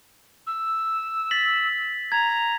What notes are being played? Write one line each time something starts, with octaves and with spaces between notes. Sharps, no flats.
E6
A6 B6 F#7
A#5 G#6